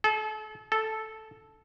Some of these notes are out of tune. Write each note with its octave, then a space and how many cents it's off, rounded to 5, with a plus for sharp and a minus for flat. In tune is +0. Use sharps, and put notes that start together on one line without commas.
A4 -35
A4 -5